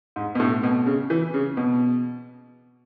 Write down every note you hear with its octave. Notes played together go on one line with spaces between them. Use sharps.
G#2
B2
A2
B2
C#3
E3
C#3
B2